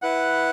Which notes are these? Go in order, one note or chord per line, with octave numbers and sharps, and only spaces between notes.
E4 B4 F#5